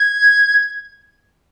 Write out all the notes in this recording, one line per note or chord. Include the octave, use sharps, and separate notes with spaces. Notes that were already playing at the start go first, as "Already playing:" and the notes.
Already playing: G#6